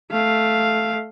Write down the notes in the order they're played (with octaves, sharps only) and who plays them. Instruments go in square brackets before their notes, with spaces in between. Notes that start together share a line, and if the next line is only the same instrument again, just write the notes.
[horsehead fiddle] A3 F5